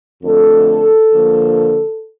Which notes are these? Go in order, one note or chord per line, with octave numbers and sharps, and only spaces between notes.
F2 D3 A3 A4
D3 F3 A#3